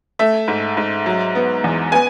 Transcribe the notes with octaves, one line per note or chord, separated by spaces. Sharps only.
A3 E5
G#2
G#2
F#3
B3
E2
B3 G#5